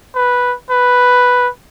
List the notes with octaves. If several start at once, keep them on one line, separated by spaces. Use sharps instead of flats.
B4
B4